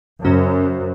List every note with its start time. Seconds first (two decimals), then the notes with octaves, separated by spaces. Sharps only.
0.24 F#2 C#3 F#3 C#4 F#4 C5